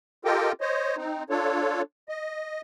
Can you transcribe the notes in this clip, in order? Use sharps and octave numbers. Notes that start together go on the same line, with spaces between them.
F4 G4 A4 A#4 D#5 G5
C5 C#5 D#5
C4 D#4
D4 F4 A4 C#5
D#5